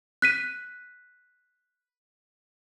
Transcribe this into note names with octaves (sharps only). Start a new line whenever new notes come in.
F#6 B6 D#7